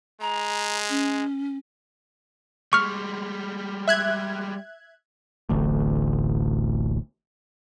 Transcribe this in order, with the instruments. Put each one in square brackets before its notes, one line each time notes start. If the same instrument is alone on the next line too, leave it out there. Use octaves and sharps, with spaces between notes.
[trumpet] G#3 [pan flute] A#5
[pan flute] C#4
[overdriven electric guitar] G3 G#3 [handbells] C#6 F6
[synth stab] E5 F#6 G#6
[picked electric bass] D1 A1 D2